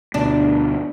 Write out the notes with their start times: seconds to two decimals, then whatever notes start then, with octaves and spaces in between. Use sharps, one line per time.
0.14 D2 B2 D4